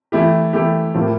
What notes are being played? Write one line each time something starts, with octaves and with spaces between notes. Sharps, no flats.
E3 A3 E4 G4
E3 A3 E4 G4
A2 F3 A#3 E4 G4